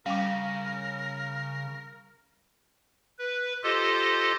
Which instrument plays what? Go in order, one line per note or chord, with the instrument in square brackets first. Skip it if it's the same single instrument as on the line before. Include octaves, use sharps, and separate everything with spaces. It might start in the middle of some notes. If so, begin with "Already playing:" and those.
[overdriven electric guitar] C#3 [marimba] G3 C#4 [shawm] A#4 [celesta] F5 D6
[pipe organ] B4
F4 G4 A4 C5 D#5